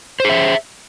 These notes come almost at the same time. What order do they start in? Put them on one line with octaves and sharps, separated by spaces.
C5 G#4 E5